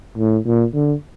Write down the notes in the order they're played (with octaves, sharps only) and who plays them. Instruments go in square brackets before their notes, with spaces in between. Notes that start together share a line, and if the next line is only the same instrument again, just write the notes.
[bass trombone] A2
A#2
D3